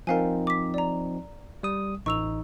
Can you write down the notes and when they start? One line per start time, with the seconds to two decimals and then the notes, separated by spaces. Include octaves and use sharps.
0.07 F3 C4 D#4 A#4 F5 G#5
0.47 D6 B6
0.74 D5 A#5
1.63 G3 D#6
2.06 A1 D#4 C#6 E6 F7